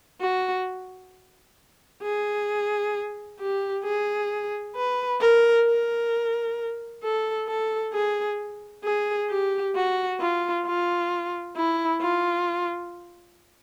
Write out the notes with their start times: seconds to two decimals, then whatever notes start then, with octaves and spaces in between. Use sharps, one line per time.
0.21 F#4
2.02 G#4
3.40 G4
3.84 G#4
4.75 B4
5.21 A#4
5.66 A#4
7.03 A4
7.48 A4
7.93 G#4
8.84 G#4
9.30 G4
9.75 F#4
10.20 F4
10.66 F4
11.56 E4
12.01 F4